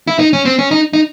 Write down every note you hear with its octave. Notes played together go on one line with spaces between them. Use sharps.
E4
D#4
C#4
C4
C#4
D#4
D#4